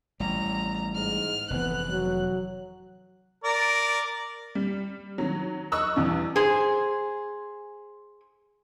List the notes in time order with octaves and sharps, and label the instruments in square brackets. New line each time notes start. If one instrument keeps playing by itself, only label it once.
[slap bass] A1 G3 [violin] A#5
[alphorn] G#2 [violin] F6
[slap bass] F1 A2 E3 [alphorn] B3 [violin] F#6
[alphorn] F#3
[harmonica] A#4 D5
[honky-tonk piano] G3
D#3 F#3
D#5 C#6 D#6 E6 F#6
E2 G2 D4
[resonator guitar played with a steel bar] G#4 C5